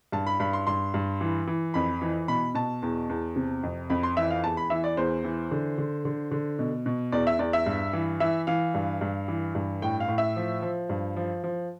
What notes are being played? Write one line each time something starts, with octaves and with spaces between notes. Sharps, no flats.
G2 A5
B5
G2 B5
C6
G2 C6
G2
E3
E3
F2 B5
E3
B2 B5
B2 A5
E2
E2
C3
F2
F2 B5
C6
E3 E5
F5
E2 A5
B5
E3 E5
D5
E2 C5
E3
D3
D3
D3
D3
B2
B2
E2 D5
E5
E2 D5
E5
G2
E3
E3 E5
E3 F5
G2
G2
E3
G2
A2 G5
F5
A2
E5
F3
F3
G2
F3
F3